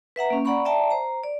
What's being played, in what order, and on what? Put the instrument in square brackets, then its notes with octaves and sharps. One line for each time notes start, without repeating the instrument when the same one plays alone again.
[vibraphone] B4 E5 F#5 A#5
A#3 C#4
D5 F#5 A#5 B5 C#6
D5 E5 G5 A5 A#5
C5 A#5
D5